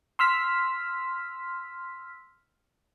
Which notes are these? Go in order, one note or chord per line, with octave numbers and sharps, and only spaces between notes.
C6 E6 F6 B6